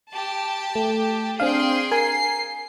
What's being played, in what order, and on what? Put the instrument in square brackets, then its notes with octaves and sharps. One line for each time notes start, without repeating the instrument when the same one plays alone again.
[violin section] G4 A5
[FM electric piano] A3
[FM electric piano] C4 D4 F5 [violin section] G#4 G5 C6
[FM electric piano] A#4 G#5 [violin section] C7